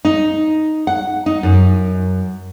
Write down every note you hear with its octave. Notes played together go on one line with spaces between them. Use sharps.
D#4
F#5
D#4
F#2